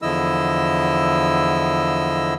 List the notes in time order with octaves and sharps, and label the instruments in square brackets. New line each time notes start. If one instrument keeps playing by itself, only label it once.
[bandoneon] E2 D3 F3 E4 D#5 E6